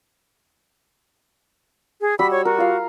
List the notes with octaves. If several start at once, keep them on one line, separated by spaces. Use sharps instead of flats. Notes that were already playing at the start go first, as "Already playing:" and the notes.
G#4
G3 F#4 B5 E6
C#5
F#4 A#4
F4 F5